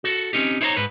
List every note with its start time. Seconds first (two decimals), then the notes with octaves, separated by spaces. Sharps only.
0.04 F#4 A4
0.33 C4 C#4 D#4 G4
0.61 D#4 E4 C5 C#5 A#5
0.77 G#2 B4